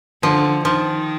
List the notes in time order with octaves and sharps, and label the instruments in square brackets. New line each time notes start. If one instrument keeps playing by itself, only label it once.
[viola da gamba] D3 [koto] F3
[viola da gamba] D#3 [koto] F3